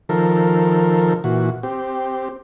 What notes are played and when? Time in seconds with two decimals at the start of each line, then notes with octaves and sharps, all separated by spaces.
0.09 D#3 F3 A4 A#4
1.24 A#2 E3 F#4
1.63 C4 G4